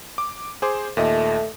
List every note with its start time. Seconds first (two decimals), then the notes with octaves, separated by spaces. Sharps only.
0.18 D6
0.62 G#4 C5 D6
0.97 D#2 A#2 A3 D#5